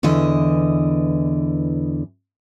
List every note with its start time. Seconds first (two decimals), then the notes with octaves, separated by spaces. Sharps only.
0.03 E2 D3 E3 D#5